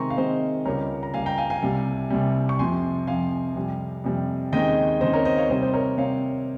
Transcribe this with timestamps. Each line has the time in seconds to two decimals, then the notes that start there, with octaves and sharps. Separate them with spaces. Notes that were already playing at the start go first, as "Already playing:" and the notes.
Already playing: C3 D#3 G#3 C4 G#5 A#5 C6 C#6
0.10 F5
0.17 C3 D#3 G#3 C4 C5 D#5
0.65 C#2 C#3 G3 A#4 C#5
1.03 A#5
1.14 C#2 C#3 G3 F5 G#5
1.26 G5 A#5
1.38 F5 G#5
1.50 F5 G#5
1.62 C2 C3 G3
2.11 C2 C3 G3
2.49 C#6
2.59 F2 C3 F3 G#5 C6
3.07 F2 C3 F3 F5 G#5
3.56 F2 C3 G3
4.04 F2 C3 G3
4.53 D#2 C#3 G#3 C4 D#4 D#5 G5
5.01 D#2 C#3 G#3 C4 D#4 C5 D#5
5.13 A#4 C#5
5.25 C5 D#5
5.37 C#5 F5
5.49 C3 G3 C4 C5 D#5
5.62 C5
5.74 A#4 C#5
5.98 C3 G3 C4 C#5 F5